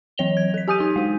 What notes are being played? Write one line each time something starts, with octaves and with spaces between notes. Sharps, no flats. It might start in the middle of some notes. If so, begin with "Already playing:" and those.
E3 F#3 C#5 F7 G7
G#6
A4 B6
G4 G#5 D#6 G6 D#7
D#4
G#3 F#4